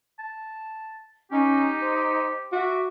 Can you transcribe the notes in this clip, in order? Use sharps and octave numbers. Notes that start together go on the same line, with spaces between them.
A5
C#4 D#4 G4
C5
F#4 E5 D6